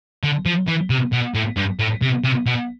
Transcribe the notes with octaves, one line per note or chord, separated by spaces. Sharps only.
D3
F3
E3
C3
B2
A2
G2
A2
C3
C3
B2